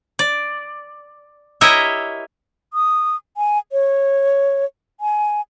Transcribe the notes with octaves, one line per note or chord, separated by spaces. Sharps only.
D5
E4 G4 A#4 C#5 D#5 E5
D#6
G#5
C#5
G#5